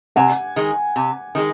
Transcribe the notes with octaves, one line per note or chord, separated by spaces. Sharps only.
C3 F#5 G#5
D#3 G#3
C3
D#3 G#3